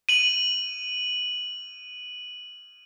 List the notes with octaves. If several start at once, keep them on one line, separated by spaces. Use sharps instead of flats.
D#7 F#7